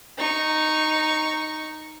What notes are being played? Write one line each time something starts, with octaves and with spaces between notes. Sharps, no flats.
D#4 C#6